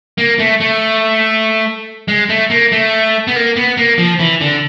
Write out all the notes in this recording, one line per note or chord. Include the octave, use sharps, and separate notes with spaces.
A#3
A3
A3
G#3
A3
A#3
A3
B3
A#3
B3
A#3
F3
E3
D3